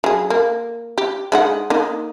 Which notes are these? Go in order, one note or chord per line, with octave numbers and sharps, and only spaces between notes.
F#3 G#4
A#3
G4
G#3 D#4 F#5
A#3 D#4